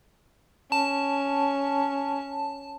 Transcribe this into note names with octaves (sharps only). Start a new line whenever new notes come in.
C#4 A5